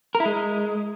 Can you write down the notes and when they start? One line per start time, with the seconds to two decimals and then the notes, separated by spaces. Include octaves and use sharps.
0.15 A#4
0.20 E4
0.25 G#3